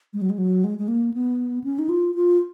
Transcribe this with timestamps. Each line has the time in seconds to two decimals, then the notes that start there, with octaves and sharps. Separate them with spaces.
0.13 G#3
0.22 F#3
0.30 G#3
0.38 F#3
0.64 G#3
0.79 G#3
0.88 A#3
1.14 B3
1.64 C#4
1.79 D#4
1.89 F4
2.15 F4